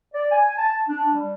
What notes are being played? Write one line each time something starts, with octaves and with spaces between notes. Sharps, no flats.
D5
G#5
A5
D4
G3